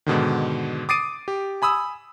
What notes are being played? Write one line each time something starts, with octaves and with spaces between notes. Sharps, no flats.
G#2 B2 D3 D#3
D6 D#6 A6 C7 D7 D#7
G4
G#5 B5 D#6 E6